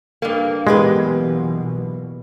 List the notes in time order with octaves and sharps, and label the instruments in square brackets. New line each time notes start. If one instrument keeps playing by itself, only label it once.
[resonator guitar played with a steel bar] G2 A#3
[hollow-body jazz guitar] B1 G4 B4 [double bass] B2 E3 [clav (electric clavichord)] G#3